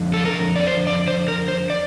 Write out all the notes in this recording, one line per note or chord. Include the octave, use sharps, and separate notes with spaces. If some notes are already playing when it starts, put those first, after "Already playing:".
Already playing: F2 D3 F3
A4
A#4
D5
C5
D5
C5
A#4
C5
D5